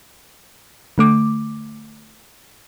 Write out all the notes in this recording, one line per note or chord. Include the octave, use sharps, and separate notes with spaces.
D3 A3 D6